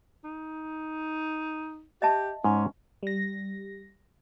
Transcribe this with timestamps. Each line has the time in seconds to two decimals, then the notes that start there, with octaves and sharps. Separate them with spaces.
0.24 D#4
2.02 G4 D#5 E5 A5
2.44 G#2 C#4
3.03 G3 A#6